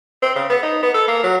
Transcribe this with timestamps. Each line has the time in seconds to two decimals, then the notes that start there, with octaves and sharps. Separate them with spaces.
0.22 C4
0.35 C#3
0.50 B3
0.63 D#4
0.83 B3
0.94 A4
1.08 A#3
1.24 F#3